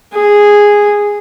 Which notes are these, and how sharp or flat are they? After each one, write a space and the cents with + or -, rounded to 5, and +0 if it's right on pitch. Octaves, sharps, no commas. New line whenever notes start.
G#4 -5